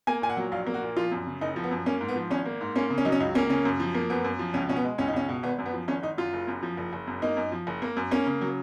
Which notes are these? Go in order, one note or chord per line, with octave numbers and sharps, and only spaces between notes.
A#3 G#5
A#2 G#5
F#5
F#3
A#1 F5
A#3
F#4
A#2
F3 F4
F#2
C#3
F#1 D#4
F3
B3
F#2
A#3 C#4
G#2
B3
F3
G#1 C#4
A#3
G#2
A#3 C#4
C#3
C#4
F#3 D#4
C#4
C#2 D#4
A#3 C#4
C#3 C#4
F#2
F3
A#3
F#2 B3
F#2
F3
C#2 C#4
B2 C#4
B3
G#3
C#2 C#4
D#4
C#2 C#4
B2
G#1 B3
F#2
B3
F3
G#1 C#4
G#1 D#4
F#2 F4
F#1
F#2
F3
F#1
F#1
F#2
A#3 D#4
F#2
F3
F#1
A#3
F#2
A#3 C#4
C#3
F#3